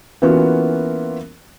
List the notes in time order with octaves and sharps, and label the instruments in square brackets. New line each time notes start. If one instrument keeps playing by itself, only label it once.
[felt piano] E3 A#3 B3 C#4 F4 F#4